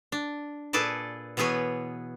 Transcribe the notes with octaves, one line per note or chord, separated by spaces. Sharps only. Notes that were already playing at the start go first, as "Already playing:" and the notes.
D4
A#2 G#4 A4 B4 D5 A5
B2 E3 B3 G#4 B4 C#5